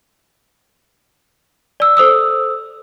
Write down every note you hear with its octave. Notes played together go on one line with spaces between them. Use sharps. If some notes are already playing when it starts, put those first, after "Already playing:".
D5 E6
A4 C5 D#6 E6